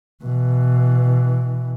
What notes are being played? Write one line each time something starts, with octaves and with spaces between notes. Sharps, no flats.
B2 E3